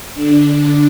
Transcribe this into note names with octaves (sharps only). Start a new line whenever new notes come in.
D3 D4